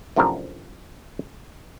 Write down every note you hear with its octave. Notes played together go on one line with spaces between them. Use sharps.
F#2 A2 C3 F3 D4 A#4